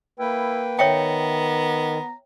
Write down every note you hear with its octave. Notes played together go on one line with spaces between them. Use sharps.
A#3 E4 B4 G5
D#3 B3 C#5 E5 G5 A#5